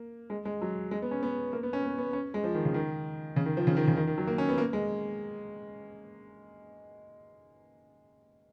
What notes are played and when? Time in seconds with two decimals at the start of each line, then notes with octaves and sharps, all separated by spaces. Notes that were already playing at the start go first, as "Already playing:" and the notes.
Already playing: A#3
0.30 G#3
0.45 G#3
0.62 F#3
0.91 G#3
1.02 B3
1.11 C#4
1.23 B3
1.53 A#3
1.63 B3
1.73 C#4
1.83 B3
1.98 B3
2.13 C#4
2.34 G#3
2.44 F3
2.54 D#3
2.65 C#3
2.74 D#3
3.36 C#3
3.46 D#3
3.57 F3
3.67 C#3
3.77 D#3
3.87 C#3
3.97 D#3
4.07 D#3
4.18 F#3
4.27 A#3
4.38 C#4
4.49 B3
4.58 A#3
4.73 G#3